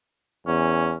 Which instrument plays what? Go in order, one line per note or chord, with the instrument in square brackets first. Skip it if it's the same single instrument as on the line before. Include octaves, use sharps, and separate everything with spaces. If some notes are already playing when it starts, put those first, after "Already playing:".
[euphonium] E2 [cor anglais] C#4